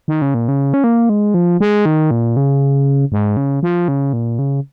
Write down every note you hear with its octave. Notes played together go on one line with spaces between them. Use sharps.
D#3
C#3
A#2
C#3
C#4
A#3
G#3
F3
G#3
D#3
A#2
C#3
G#2
C#3
F3
C#3
A#2
C#3